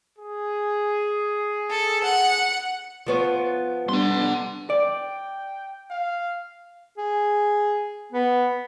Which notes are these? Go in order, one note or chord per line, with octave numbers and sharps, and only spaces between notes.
G#4
A4
F#5
F3 B3 C#5
G3 B3 D4 F#5 C6
D5 G5
F5
G#4
B3